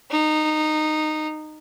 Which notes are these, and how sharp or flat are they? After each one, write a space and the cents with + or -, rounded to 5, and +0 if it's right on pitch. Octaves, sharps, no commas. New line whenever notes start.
D#4 -15